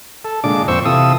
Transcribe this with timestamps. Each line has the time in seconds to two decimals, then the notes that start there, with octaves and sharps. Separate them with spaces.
0.25 A4
0.44 A#2 D3 G#3 D4 D6
0.68 F2 A#2 C4 C5 C#6 E6
0.85 C3 E3 F4 A4 D#6 E6